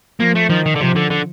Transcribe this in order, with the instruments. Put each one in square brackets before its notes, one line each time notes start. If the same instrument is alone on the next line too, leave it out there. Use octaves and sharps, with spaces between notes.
[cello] F3 [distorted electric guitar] A#3
[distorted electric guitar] A3
[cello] D#3 [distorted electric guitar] F3
[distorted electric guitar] D#3
D3
[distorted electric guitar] C3 [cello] F3
[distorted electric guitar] D3
D3